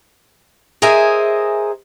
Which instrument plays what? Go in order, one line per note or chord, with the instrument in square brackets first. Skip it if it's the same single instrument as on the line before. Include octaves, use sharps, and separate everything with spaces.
[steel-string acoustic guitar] G#4 A#4 C5 D#5 E5 G#5